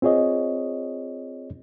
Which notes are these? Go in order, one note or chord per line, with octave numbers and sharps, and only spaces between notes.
C4 F4 G#4 C#5 D#5